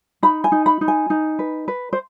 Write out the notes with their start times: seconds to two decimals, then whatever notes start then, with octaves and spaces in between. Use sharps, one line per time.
0.23 D#4 B5
0.44 G#5
0.52 D#4
0.66 B5
0.81 D#4
0.88 G#5
1.10 D#4
1.39 B4
1.68 B4
1.93 C5